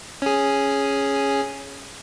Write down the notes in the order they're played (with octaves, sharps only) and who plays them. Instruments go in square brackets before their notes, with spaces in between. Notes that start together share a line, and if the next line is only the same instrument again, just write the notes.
[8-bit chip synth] C#4 G#4